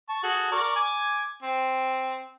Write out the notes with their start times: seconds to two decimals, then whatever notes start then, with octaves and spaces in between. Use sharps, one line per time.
0.09 A5 C#6
0.23 F#4 G#4 A4
0.52 A#4 D5 C#6
0.76 G#5 D6
1.43 C4